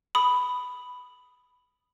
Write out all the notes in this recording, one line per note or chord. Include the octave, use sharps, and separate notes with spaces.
B5 D#6